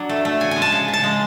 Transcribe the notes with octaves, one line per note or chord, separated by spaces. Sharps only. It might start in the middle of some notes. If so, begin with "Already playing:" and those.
Already playing: F#3 D4
A3
A3
C#3 G#5
G#3 G#5
A5
C#3
C#3
A5
G#3